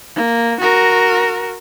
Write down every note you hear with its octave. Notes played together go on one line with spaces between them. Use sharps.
A#3
F#4 A#4